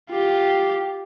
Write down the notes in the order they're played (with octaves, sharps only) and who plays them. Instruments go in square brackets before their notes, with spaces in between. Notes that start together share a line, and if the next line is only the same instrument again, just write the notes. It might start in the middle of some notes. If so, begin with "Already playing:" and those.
[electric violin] F4 G4